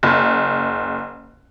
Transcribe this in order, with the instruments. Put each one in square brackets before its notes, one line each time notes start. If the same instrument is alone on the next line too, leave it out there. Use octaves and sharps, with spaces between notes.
[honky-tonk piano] F#1